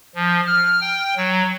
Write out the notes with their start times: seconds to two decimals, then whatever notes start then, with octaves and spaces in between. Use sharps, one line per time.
0.15 F3
0.47 F6
0.81 G5
1.17 F#3